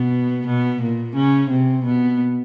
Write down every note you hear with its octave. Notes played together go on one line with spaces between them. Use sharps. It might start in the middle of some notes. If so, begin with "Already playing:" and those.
Already playing: B2 B3
B2 B3
A#2 A#3
C#3 C#4
C3 C4
B2 B3